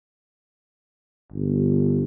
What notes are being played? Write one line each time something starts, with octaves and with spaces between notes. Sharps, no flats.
G1